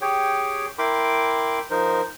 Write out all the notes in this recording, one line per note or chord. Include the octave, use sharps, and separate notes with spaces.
G4 G#4 C#5 G5
E4 A#4 G5 B5 C6 D6
F3 D#4 A#4 C5